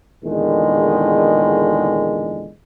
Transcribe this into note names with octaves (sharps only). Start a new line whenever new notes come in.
E2 A#2 D3 D#3 G#3